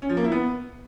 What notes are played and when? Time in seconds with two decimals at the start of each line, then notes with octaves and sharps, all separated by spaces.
0.02 C#4
0.09 F3
0.17 A#3
0.24 E4
0.32 B3